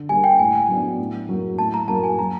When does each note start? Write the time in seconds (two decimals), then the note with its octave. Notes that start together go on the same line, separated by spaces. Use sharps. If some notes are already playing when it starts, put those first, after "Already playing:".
Already playing: D3
0.09 G3 A#3 G#5
0.24 G5
0.39 A2 G#5
0.69 F#3 B3 D4
0.99 A2
1.29 F#3 A#3
1.59 A2 A5
1.74 A#5
1.88 F#3 A#3 A5
2.04 G#5
2.18 F#3 A#5